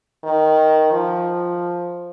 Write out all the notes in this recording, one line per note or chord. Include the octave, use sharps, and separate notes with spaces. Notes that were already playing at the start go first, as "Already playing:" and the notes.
D#3
F3